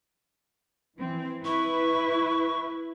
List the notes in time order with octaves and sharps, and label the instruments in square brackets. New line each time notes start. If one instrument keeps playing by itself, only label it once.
[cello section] E3 C4
[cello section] E4 B4 [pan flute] C#6